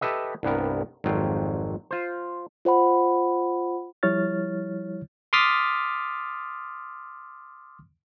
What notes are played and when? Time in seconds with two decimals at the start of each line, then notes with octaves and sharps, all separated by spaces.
0.01 G4 A4 B4 D#5 E5
0.43 C2 G2 B3 A#4
1.04 G#1 F2 F#3 F4 G5
1.91 F4 C5
2.65 F4 C5 F#5 B5
4.03 F3 G3 E4 C#5 F6 A6
5.33 C6 D6 D#6 F6 A6 B6